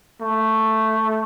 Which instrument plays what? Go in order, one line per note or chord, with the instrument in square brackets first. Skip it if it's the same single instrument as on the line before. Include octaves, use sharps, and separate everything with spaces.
[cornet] A3